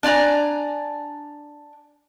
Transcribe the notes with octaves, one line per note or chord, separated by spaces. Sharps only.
D4 D5 G#5 A#5